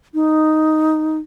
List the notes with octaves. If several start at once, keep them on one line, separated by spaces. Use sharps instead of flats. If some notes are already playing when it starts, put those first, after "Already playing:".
D#4